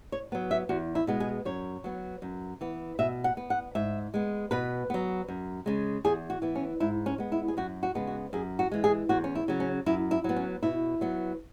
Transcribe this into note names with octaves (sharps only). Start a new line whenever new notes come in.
C#5
F#3 B3
E5
E2 F#4
E4
B2 G#3 B3
G#4
F#2 C#5
F#3 B3
F#2
E3 B3
B2 E5
F#5
B3
F#5
G#2 E5
G#3 B3
B2 B4
F#3 B3
F#2
C#3 G#3
E2 G#4
F#4
E3 B3
C#4
G#2 E4
C#4
G#3 B3
E4
G#4
F#2 F#4
F#4
C#3 G#3 B3
F#4
F#2 G#4
F#4
E3 G#3
G#4
E2 F#4
C#4
E4
C#3 F#3
C#4
F#2 E4
E4
F#3 B3
C#4
B2 E4
F#3 B3